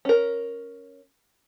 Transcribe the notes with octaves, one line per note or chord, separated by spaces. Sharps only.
C#4 A#4